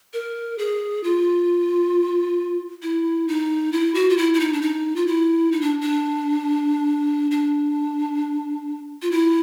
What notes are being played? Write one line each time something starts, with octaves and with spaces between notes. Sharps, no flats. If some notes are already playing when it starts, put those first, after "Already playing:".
A#4
G#4
F4
E4
D#4
E4
F#4
F4
E4
E4
D#4
D4
D#4
F4
E4
D#4
D4
D4
D4
F4
E4